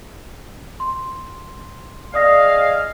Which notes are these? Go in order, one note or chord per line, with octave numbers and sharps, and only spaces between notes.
C6
G#4 D5 D#5 F5 D#6 A#6